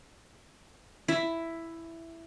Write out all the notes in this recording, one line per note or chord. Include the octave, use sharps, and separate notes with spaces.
E4 E5